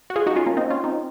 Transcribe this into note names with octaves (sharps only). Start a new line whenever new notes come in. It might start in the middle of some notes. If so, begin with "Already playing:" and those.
F#4
F4 G#4
D#4 F#4
C#4 F4
A#3 C#4
C4 D#4
C#4 F4
C4 D#4